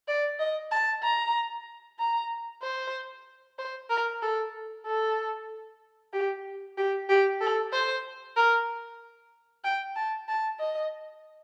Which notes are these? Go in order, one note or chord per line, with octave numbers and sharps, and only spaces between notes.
D5
D#5
A5
A#5
A#5
C5
C5
A#4
A4
A4
G4
G4
G4
A4
C5
A#4
G5
A5
A5
D#5